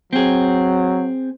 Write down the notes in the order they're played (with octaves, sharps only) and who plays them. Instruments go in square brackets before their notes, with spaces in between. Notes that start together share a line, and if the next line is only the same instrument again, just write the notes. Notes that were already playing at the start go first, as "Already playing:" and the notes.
[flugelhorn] F#3 [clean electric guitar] C4 G#4